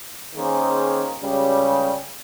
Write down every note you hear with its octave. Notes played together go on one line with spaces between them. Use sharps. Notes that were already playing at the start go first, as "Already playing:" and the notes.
D#3 A#3 C#4 G#4 C5
C#2 C#3 G3 C#4 G4